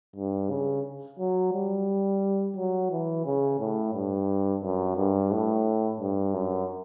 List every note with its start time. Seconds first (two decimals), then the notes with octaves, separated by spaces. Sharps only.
0.16 G2
0.50 C#3
1.19 F#3
1.53 G3
2.56 F#3
2.91 E3
3.25 C#3
3.59 A2
3.94 G2
4.63 F#2
4.97 G2
5.31 A2
6.00 G2
6.34 F#2